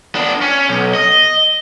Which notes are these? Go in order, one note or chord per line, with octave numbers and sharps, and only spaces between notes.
B3 D4
C#4
B1
D#5